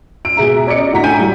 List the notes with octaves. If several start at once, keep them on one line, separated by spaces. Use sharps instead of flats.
E6 D7
B2 G#4 E5 A#5
C#4 D5 D#5 C#7
A2 D3 F#4 A#5 B6
A2 G5 G#5 G6 D#7
G3 F#4